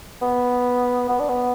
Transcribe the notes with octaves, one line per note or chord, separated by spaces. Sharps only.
B3
B3
D4
B3